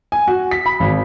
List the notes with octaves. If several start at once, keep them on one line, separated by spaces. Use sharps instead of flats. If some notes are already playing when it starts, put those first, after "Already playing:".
G#5
F#4
B6
B5
G#1